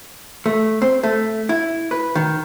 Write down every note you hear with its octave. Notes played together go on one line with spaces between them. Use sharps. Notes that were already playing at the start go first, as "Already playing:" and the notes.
A3
C4
A3
E4
B4
D#3